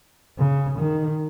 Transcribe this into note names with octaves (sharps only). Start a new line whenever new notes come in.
C#3
D#3